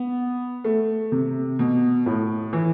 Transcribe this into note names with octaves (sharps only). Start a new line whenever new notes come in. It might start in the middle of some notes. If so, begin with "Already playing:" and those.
Already playing: B3
A3
C3
B2
A2
E3